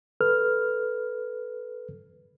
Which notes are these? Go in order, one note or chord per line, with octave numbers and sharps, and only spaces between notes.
A4 B4 F6